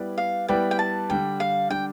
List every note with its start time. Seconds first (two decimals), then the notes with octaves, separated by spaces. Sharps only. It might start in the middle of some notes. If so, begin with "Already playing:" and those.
Already playing: G3 B3 E4 B4 D5
0.18 F5
0.48 G3 B3 E4 B4 D5 G5
0.71 G5
0.79 A5
1.09 D3 G3 D4 G5
1.40 F5
1.70 D3 G3 D4 G5